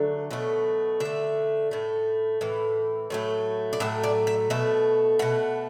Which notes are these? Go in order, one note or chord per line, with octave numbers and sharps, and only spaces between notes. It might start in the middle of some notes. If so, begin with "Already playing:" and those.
Already playing: D3 F#3 A3
B2 F#3 A3
D3 A3 E5
A2 A3
A2 E3
A2 F#3 A3
D5
A2 F#3 A3 E5
D5
E5
B2 A3 E5
B2 A3 F#5